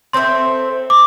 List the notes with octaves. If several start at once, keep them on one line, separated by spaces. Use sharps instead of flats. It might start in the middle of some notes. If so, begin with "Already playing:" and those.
C4 A4 E5 C6
D6